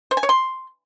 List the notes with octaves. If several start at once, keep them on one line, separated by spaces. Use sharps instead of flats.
C5
G#5
C#5
C6